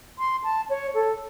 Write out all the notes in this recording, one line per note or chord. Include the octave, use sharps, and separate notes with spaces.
C6
A5
C#5
A4